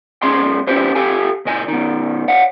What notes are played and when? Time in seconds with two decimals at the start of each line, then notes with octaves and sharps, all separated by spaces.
0.22 B1 G#2 C#4 G#4 D#5 C6
0.67 C#4 D4 E4 G4 B4 C5
0.95 G4 A4 F5 G#5
1.45 C#2 A#2 D#5 G#5
1.68 B2 D#3
2.28 C#5 F5 F#5